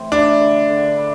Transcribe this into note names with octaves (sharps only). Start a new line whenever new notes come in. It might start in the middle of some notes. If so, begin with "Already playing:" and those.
Already playing: A2 E3 C4
D4 E4
D3
D3
E4